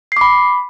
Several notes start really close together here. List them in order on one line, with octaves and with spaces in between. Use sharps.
C7 D6 B5